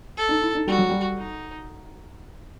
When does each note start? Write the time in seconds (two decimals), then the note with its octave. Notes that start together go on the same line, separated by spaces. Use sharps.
0.17 A4
0.29 D#4
0.42 E4
0.55 D#4
0.67 G3 F#4
0.78 F#3
0.89 G3
1.17 D#4